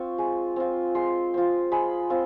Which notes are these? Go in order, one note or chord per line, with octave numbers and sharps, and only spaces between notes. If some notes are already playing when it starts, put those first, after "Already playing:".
Already playing: C4 F4 C#6
G#3
C4 F4
G#3 C6
C4 F4
G#3 B5
C4 F4